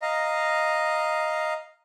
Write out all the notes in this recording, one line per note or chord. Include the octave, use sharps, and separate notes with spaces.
D#5 F5 A#5